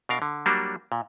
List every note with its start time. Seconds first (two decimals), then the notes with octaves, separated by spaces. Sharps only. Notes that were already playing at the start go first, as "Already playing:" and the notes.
0.09 B2 D4 A#4 F5
0.22 D3
0.46 F#3 G3 A#3 D4 F#4
0.92 A#2